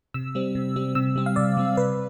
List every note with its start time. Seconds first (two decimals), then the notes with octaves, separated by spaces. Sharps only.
0.14 C3 E6
0.35 G3 C4
0.55 C3
0.76 G3 C4
0.95 C3 E6
1.16 G3 C4
1.26 F5
1.36 C3 D5
1.57 G3 C4
1.77 C3 B4